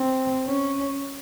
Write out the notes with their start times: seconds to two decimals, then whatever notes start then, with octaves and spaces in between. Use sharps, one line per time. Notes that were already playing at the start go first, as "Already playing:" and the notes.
Already playing: C4
0.47 C#4